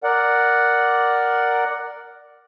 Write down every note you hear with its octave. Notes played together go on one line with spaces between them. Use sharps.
A#4 D5 F#5